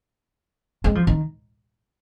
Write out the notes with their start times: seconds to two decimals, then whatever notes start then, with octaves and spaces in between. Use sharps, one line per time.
0.84 G#3
0.95 F3
1.07 D#3